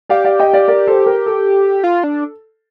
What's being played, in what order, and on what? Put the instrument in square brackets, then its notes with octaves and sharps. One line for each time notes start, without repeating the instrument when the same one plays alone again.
[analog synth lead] G4 [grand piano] D5 F5
[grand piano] D5 F5
D#5 G5
D5 F5
A#4 D5
A4 C5
A#4
A4
[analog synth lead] F4
D4